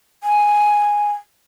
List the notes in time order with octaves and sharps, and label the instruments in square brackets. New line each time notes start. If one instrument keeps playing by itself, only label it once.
[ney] G#5